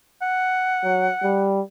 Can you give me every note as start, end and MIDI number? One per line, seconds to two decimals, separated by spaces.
0.22 1.49 78
0.84 1.08 54
1.23 1.61 55